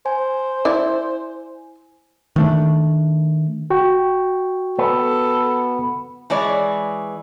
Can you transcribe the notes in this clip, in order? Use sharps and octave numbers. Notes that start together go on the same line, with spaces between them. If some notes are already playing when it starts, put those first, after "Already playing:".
C5 G#5
E4 D5
D#3 A3 D4
F#4 G5 C#6
B3 A4
E3 G#3 C#5 D5